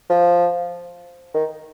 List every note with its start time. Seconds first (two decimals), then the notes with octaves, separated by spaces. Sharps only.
0.10 F3
1.34 D#3